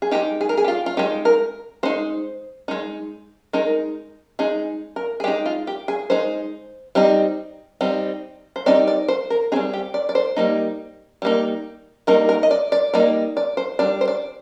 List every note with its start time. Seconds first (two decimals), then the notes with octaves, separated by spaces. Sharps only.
0.02 G#4
0.11 G#3 D#4 G4
0.41 G#4
0.49 A#4
0.57 G#4
0.64 G4
0.68 F4
0.86 F4
0.97 G#3 D#4 G4
1.25 A#4
1.83 G#3 D#4 C5
2.68 G#3 D#4
3.53 G#3 D#4 A#4
4.39 G#3 D#4 G#4
4.96 A#4
5.20 G#4
5.24 G#3 G4
5.28 D#4
5.46 F4
5.67 G4
5.88 G#4
6.10 G#3 D#4 C5
6.95 G3 C4 D#4
7.81 G3 C4 D#4
8.56 C5
8.66 G3 C4 D#4 D5
8.87 D5
9.08 C5
9.30 A#4
9.52 G3 C4 D#4 G#4
9.73 G4
9.94 D5
10.09 D5
10.15 C5
10.36 G3 A#3 D#4
11.22 G3 A#3 D#4
12.07 G3 A#3 D#4 A#4
12.29 A#4
12.43 D#5
12.51 D5
12.72 D5
12.94 G3 A#3 D#4 D5
13.37 D5
13.57 C5
13.79 G3 D4 D5
14.01 C5
14.08 D5